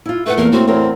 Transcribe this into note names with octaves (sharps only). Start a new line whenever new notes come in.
E4 F4
A3 F4 B4 F#5
E2 A#3 A#4
A2 C4 F#4
E2 C4 A#4 C#5